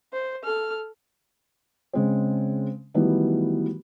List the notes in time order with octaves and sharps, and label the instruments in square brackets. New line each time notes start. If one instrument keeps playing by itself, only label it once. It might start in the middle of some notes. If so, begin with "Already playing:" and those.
[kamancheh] C5
A4 F6
[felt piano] C#3 G#3 C4
D#3 E3 F#3 G3 A3 B3